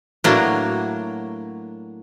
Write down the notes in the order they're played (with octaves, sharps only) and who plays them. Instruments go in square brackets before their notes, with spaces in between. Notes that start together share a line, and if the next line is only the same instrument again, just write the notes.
[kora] A2 F#4 B4 [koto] F#3 A#3 D4